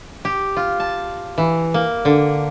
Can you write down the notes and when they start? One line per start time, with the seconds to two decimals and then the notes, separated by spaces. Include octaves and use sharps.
0.25 G4
0.57 F4
0.80 A5
1.38 E3
1.74 A#3
2.05 D3